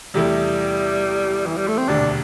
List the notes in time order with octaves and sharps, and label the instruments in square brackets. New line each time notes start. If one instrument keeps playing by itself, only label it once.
[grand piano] E2 C3 A3 E4 [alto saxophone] G3
[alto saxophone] E3
G3
A3
C4
[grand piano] E1 D2 C3 [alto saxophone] D4